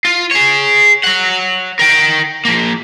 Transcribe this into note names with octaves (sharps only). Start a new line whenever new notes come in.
F4
G#4 C#5
C#5 F#5
A#4 G5
F3 A#3